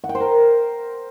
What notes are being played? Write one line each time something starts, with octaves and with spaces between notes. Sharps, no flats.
F#5
G5
C5
A#4